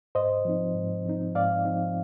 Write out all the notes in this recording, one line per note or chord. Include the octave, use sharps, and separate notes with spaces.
G#2 C5 D#5
F3 C4 D#4
G#2
F3 C4 D#4
G#2 D5 F5
F3 C4 D#4